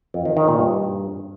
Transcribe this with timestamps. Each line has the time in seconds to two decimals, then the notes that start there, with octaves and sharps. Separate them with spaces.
0.14 F2
0.25 D#3
0.37 D#3
0.48 A#2
0.59 G2